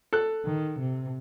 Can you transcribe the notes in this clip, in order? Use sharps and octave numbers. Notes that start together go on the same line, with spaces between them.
A4 F#6
D#3
C3